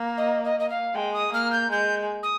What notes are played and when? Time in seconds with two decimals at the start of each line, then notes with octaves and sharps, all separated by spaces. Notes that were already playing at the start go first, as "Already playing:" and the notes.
Already playing: A#3
0.17 D#5
0.44 D#5
0.59 D#5
0.70 F5
0.94 G#3 G5
1.13 D#6
1.33 A#3 F6
1.52 G6
1.71 G#3 G6
2.23 D#6